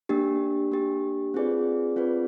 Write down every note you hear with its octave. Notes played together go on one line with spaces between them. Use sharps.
A#3 D4 G4
A#3 D4 G4
C4 F4 G#4 B4 D5
C4 F4 G#4 B4 D5